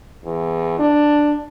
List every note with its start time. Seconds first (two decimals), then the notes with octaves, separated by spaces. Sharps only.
0.25 E2
0.79 D4